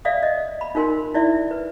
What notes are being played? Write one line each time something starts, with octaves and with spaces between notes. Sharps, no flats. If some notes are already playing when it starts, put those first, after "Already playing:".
D5 E5 F5 D#6
D#5
B5
D#4 F4 A#4 G#5 C6
E4 D5 E5
B4